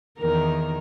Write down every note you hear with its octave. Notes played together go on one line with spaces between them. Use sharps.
E2 D#3 A#4